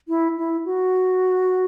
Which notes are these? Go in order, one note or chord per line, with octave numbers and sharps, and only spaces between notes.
E4
E4
F#4